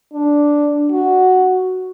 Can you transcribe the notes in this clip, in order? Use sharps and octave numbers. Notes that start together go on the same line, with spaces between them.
D4
F#4